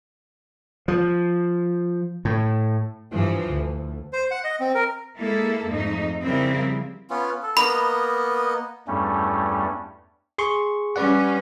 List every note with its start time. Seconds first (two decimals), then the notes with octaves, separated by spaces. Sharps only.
0.88 F3
2.25 A2
3.11 G2 E3 F3
3.49 D2
4.13 C5
4.31 F#5
4.44 D#5
4.60 C4
4.75 A#4
5.19 G#3 A#3 E4 A4
5.67 F2 G#2 A3 D#4
6.23 C#3 F3 G3 C4 E4 A#4
7.10 B3 C#4 F4
7.43 A4
7.57 A#3 B3 D#5 B5
8.87 E2 G2 G3 A3 C#4
10.38 G#4 C6 C#6
10.96 G3 C#4 B4 D5 F#5